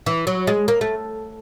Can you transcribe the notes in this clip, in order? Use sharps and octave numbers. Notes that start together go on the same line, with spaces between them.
E3
F#3
G#3
A#3
A3